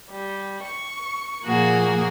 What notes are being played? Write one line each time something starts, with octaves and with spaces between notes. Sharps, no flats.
G3
C#6
A#2 F3 A#3 F#4 G#4